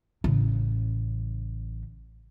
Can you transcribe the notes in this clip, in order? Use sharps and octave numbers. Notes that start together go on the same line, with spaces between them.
A1 C#3